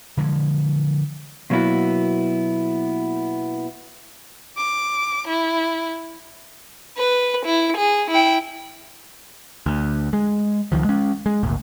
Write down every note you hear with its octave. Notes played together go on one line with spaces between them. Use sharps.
D3 E3 F3 G#3
B2 F#3 A#3 B3 E4 F#4
D6
E4
B4
E4
G#4
E4 G5
D2
G#3
C#2 D#3 F3
G#3 C#4
G#3
G#1 D2 A#2